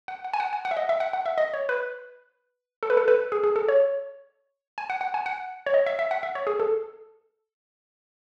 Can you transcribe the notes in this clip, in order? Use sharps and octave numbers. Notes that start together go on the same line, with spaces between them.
F#5
F#5
G#5
F#5
G#5
F#5
E5
D#5
E5
F#5
F#5
E5
D#5
C#5
B4
A4
B4
A4
B4
G#4
G#4
A4
C#5
G#5
F#5
F#5
G#5
F#5
C#5
D#5
E5
E5
F#5
E5
C#5
G#4
A4